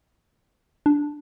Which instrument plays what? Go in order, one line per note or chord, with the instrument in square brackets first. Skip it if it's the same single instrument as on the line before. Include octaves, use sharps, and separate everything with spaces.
[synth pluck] D4